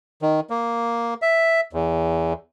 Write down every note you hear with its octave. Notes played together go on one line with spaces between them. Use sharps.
D#3
A#3
E5
E2